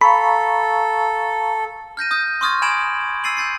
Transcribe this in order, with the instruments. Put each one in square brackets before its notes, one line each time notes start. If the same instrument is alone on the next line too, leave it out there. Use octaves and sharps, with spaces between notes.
[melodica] A4 [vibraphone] F5 A#5 C#6 [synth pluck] B5
[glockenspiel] F6 G6 A#6 D#7
D#6 G6
C6 C#6 D#6 F6 G#6 A6
G#5 B5 G#6 D7 E7 F#7
E6 A6 C7 D#7 F#7
E6 G6 A6 C7